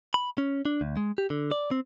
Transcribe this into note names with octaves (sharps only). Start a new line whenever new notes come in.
B5
C#4
D4
D2
G#3
G4
D3
D5
C4